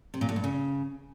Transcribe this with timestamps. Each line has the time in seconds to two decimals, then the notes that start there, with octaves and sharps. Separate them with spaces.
0.14 C3
0.21 A#2
0.29 A2
0.36 G2
0.44 C#3